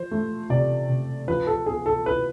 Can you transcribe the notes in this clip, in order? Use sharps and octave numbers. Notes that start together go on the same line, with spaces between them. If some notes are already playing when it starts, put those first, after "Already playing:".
Already playing: F3 C5
A3
C3 D5
C3
F3 B4
A4
B3 G#4
A4
E4 B4